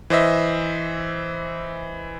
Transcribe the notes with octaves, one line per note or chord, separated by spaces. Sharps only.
E3 C5 D#5 E5